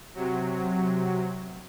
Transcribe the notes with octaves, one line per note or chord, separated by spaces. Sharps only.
C3 F#3